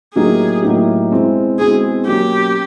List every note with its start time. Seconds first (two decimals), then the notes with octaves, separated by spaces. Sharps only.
0.15 A2 F#3 A#3 D#4 G4 G#4
0.63 A2 F#3 A#3 D#4 G4
1.10 B2 G#3 C4 E4
1.59 B2 G#3 C4 E4 G#4
2.06 B2 F#3 A#3 C#4 G4